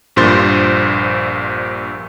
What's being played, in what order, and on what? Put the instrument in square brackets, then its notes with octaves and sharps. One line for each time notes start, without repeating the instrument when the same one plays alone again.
[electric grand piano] A#1 G2 A#2 C5 C6 A6